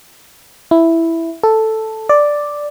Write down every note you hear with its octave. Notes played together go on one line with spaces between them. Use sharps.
E4
A4
D5